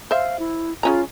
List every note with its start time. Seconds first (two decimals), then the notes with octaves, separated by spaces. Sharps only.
0.11 C5 E5 F5
0.39 E4
0.83 C#3 C#4 F4 A#5